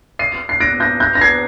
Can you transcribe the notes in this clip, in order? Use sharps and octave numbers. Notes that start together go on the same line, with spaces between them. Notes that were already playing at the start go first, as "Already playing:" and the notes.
C7 D#7
C7
A#6 D7
G6 A#6
G6 A#6
A#6
G#6 C7